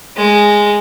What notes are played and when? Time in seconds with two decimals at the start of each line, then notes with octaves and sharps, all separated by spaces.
0.17 G#3